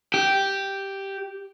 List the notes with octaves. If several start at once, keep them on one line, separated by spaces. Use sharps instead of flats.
G4